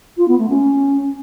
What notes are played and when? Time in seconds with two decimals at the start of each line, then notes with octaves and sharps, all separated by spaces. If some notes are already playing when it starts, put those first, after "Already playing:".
0.17 F4
0.28 B3
0.39 A3
0.49 C#4